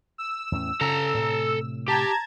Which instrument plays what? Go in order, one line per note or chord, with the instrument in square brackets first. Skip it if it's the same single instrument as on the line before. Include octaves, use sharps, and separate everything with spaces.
[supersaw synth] E6
[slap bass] E2 A2 C#4
[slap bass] C#3 [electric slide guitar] A4 A#5
[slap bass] A2 C3
[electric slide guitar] G4 [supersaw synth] A5 A#5 G#6